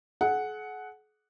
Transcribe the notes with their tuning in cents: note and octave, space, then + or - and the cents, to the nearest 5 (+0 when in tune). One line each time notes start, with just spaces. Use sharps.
G#4 +45 F#5 +0